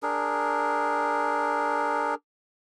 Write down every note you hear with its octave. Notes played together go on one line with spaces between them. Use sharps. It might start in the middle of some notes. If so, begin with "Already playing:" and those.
D4 G#4 A#4